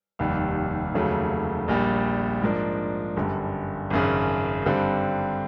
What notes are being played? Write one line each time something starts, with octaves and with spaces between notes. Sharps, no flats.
F1 D#2 D#3 G3
F1 D#2 C#3 F#3 A3
A#1 A#2 G3
G#2 F3 A#3 D4
G1 F#2 D3 G3
G#1 F#2 C#3
G2 D3 G3 C4